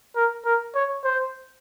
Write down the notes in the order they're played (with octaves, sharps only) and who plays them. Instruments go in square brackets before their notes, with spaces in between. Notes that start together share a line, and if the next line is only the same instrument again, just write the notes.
[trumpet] A#4
A#4
C#5
C5